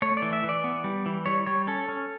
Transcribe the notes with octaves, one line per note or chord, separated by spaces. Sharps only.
A3 C#5
D5
E3
E5
E3 D5
B3
G3
E3
G3 C#5
G3 C#5
C#4 A4
C#4